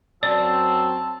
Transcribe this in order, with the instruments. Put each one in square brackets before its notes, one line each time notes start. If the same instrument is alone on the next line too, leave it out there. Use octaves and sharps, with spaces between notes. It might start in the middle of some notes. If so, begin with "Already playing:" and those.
[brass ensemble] F#2 F#3 C4 [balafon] D5 [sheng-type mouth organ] A5 [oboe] E6